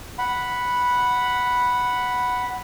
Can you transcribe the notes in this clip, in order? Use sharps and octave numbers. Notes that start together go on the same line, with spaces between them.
F#5 B5